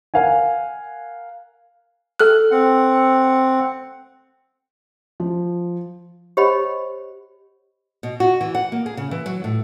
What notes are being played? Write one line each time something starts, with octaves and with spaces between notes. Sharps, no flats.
A#4 F5 F#5 G#5
A4 F6 F#6
C4 F#5
F3
G4 C5 C#5 D#5 F#5 B5
B2
F#4
E3
F#5
A#3
G#4
C#3
E3
F#3
A2